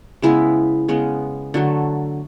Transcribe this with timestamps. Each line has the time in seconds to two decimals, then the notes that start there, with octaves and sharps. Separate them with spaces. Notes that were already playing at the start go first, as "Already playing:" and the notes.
0.22 C#3 G#3 B3 E4
0.88 C#3 G#3 B3
1.54 D3 F#3 A3